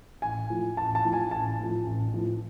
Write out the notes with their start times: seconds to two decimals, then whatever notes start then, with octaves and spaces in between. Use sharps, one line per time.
0.22 A1 G#5
0.50 A2 F3
0.77 A1 A5
0.95 A5
1.05 A2 F3
1.13 G#5
1.31 A1 A5
1.60 A2 F3
1.86 A1
2.14 A2 F3